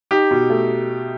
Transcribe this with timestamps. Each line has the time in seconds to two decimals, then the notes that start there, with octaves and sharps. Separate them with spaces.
0.11 D#4 G4
0.31 B2
0.50 A3